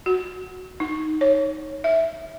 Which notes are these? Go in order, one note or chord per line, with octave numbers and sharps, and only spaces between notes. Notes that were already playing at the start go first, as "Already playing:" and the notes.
F#4
D#4
C#5
E5